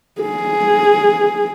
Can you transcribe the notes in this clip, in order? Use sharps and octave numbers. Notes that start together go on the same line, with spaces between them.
G#4